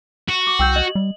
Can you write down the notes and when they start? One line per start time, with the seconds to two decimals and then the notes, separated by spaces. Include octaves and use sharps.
0.29 F#4
0.47 D6
0.59 C2 G5 E6 G6
0.76 D#5 F#7
0.95 G3